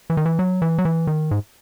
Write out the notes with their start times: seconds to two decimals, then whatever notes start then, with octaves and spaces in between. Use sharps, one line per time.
0.10 E3
0.17 D#3
0.26 E3
0.39 F#3
0.62 E3
0.78 F#3
0.85 E3
1.07 D#3
1.31 G#2